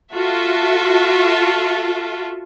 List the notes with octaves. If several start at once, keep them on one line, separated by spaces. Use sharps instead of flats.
F4 F#4 A4 E5